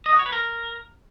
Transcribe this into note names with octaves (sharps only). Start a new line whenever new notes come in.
D#5
F#4
C#5
B4
A#4